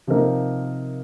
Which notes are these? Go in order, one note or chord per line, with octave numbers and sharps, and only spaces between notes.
C3 F3 A#3 D#4 A#4